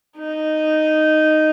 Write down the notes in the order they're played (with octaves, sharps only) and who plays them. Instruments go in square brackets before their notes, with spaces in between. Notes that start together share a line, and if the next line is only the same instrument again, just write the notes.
[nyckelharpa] D#4